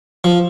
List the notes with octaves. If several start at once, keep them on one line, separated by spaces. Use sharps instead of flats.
F3